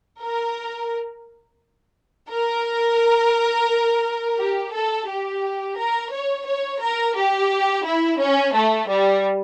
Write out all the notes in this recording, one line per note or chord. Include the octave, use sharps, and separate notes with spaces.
A#4
A#4
G4
A4
G4
A#4
C#5
C#5
A#4
G4
E4
C#4
A3
G3